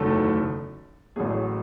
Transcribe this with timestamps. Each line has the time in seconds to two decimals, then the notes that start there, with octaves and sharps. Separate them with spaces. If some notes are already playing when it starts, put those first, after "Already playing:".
Already playing: F#1 E2 D#3 F#3 A3 A4
1.16 A1 A2 F#3 A3 G#4